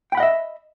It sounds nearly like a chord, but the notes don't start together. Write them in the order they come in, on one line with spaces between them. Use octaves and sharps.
G5 B5 F#5 D#5 E5